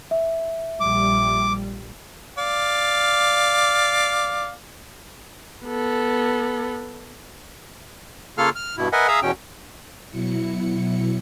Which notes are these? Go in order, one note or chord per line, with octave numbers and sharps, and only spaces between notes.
E5
A#1 G3 D6
D5 F5
B3 A4
C#3 A#3 F4 A4 F5 F6
F6
G2 B2 E4
A#4 B4 D#5 E5 F#5 G#5
G#4 E5 F5 A#5 D#6 E6
E2 B2 C#4 G5
B2 F#3 E4 C#7